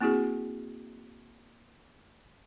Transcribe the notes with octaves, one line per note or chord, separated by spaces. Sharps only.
A#3 C4 E4 F#4 G#4